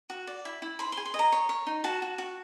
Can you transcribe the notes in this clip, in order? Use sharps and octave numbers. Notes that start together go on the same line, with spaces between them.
F#4
D5
E4
E4
C5 B5
C6
G#4
C6
D#5
A#5
C#5
C#5
D#4
F#4 A5
F#4
F#4